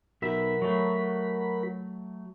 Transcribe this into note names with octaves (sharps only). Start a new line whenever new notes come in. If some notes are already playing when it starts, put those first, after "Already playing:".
B1 F#4 A#4 E5 B5
F#3 A3